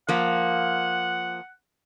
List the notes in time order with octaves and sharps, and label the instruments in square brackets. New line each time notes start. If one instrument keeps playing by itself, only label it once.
[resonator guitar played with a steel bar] F3 A#3 [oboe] F#5